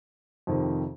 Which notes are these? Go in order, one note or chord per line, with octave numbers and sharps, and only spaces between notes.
F2 C3 D#3